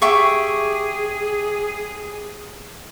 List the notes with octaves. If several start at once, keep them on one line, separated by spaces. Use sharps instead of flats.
G4 G#4 E5 C#6